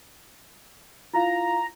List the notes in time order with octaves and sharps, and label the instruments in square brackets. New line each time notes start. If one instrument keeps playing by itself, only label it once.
[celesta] E4 F4 F5 [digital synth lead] A#5